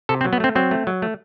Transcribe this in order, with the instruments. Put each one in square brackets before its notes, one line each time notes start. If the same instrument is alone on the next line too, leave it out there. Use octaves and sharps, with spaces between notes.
[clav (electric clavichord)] C3 A4
C4
F#3
B3
A3 C4
F#3 C4
A3
F#3
A3